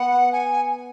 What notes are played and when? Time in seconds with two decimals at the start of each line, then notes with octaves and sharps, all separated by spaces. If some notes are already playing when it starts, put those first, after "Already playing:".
Already playing: B3 F#5
0.32 G#5